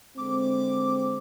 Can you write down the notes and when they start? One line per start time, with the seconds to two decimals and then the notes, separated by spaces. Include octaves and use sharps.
0.18 D3 G#3 C4 D6